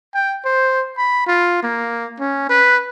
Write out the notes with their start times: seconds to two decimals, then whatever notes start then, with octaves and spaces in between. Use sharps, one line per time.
0.15 G5
0.45 C5
0.97 B5
1.27 F4
1.63 A#3
2.20 C#4
2.49 B4